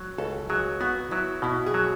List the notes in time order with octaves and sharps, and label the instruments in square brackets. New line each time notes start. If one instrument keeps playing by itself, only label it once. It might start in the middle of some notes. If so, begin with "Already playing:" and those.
Already playing: [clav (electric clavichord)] F#3
[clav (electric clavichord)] C#2 [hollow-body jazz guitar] A4
[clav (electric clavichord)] F#3 [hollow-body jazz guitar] G#4
[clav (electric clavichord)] B3 [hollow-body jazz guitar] F#4
[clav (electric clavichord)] F#3 [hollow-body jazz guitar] E4
[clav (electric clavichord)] B2 [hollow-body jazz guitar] E4
[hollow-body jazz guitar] G#4
[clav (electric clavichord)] F#3